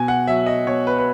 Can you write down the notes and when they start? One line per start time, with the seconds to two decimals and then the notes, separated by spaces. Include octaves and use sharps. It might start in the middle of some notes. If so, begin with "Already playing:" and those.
Already playing: B2 G#5
0.08 F#5
0.27 F#3 E5
0.46 D#5
0.66 B2 C#5
0.87 B4
0.98 B4